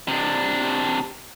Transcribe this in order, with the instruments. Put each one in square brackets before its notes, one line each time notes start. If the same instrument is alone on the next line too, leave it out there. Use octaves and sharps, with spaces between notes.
[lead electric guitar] C3 D4